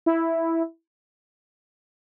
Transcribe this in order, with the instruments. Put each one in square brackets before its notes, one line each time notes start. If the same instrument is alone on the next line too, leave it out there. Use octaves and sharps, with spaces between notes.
[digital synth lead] E4